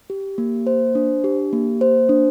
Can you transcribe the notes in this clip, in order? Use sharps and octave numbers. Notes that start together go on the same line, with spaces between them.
G4
A#3
C5
D4
G4
A#3
C5
D4